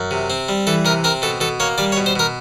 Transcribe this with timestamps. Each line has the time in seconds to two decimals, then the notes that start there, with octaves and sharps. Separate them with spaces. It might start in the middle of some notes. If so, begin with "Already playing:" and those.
Already playing: F#2
0.11 C3
0.30 C4
0.49 G3
0.67 E3 A4
0.85 C3 A#4
1.04 C4 A#4
1.22 B2 A4
1.41 B2 A4
1.60 A#3 C#5
1.78 G3 D5
1.92 C#5
1.97 B2
2.06 C5
2.16 B2 A#4